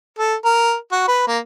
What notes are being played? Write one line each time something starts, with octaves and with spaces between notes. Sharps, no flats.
A4
A#4
F#4
B4
A#3